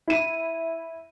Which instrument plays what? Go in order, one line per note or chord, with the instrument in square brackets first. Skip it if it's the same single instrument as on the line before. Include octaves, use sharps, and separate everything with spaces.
[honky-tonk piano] E4 D#7